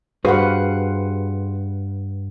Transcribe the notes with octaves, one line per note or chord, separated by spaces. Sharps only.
G2 F#4 G#4 B4 C5 F5 F#5